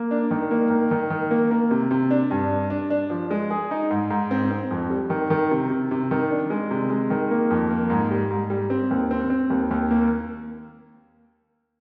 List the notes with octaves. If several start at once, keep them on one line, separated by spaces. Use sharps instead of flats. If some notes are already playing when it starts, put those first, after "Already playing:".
Already playing: A#3
D4
D#3
A#3
D#3
D#3
D#3
A#3
A#3
C3
C3
D4
G2
D4
D4
D4
F3
G#3
G#4
D#4
G#2
G#2
C4
C4
F2
G3
D#3
D#3
C3
C3
C3
D#3
D4
G#3
C3
G#3
D#3
A#3
F2
A#3
G#2
G3
G#2
G3
C4
D#2
C4
C4
D#2
D#2
A#3